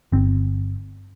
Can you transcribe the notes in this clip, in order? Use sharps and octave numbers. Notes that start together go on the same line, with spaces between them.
G1 C4